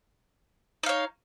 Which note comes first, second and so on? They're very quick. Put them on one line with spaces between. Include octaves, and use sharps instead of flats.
D#4 F5 C#5